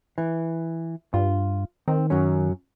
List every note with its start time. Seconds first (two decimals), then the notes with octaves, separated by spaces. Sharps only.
0.18 E3
1.14 G2 F4
1.88 D#3 C4
2.10 F#2 F#3 C#4